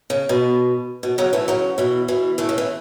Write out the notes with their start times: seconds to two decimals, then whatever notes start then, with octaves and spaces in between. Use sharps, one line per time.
0.10 C#3
0.29 B2
1.03 B2
1.18 C#3 F#3
1.33 E3 A3
1.48 C#3 F#3
1.78 B2 E3
2.08 B2 E3
2.38 E3 A3
2.49 C#3
2.58 E3